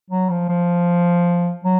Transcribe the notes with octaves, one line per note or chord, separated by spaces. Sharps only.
F#3
F3
F3
F#3